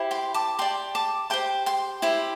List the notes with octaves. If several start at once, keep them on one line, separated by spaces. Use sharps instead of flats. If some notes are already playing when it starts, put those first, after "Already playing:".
Already playing: E4 G4 C5
G5 C6
A5 D6
G4 D5 G5 C6
A5 D6
G4 C5 G5 C6
G5 C6
E4 G4 C5